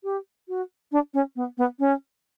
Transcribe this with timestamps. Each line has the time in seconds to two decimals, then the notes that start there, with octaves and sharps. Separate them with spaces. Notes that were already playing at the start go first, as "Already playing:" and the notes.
0.04 G4
0.48 F#4
0.92 D4
1.14 C#4
1.36 B3
1.58 B3
1.79 C#4